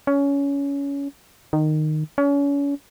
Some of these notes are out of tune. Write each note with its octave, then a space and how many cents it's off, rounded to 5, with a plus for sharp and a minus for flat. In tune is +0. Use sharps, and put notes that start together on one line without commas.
C#4 +20
D#3 -15
C#4 +35